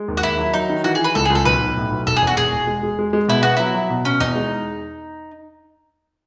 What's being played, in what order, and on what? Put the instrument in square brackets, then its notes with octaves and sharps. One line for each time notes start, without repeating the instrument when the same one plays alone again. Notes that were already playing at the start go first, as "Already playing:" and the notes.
Already playing: [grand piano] G#3
D#2
[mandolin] F#4
[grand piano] D#2 [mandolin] E4
[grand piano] F#3
[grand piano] F#3 [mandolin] D#4
[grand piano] D#3
[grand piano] E3 [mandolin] F#4
[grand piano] E3 [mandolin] G#4
[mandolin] B4
[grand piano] C#2 [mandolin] A4
[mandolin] G#4
[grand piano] C#2
[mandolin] A4
[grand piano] B1 [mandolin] B4
[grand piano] B1
A2
B1
[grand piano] E1 [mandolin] A4
[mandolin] G#4
[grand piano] E2
[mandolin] F#4
[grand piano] E1 [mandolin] G#4
[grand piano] E1
G#3
G#3
G#3
G#3
[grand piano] B2 [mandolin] E4
[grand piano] B3 [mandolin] F#4
[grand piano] F#3 [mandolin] E4
[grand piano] F#3
B2
[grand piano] B2 [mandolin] C#4
[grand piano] E2 [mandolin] D#4
[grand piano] G#3